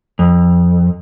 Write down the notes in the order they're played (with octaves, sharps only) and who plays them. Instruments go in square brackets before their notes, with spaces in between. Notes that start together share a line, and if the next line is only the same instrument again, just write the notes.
[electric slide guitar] F2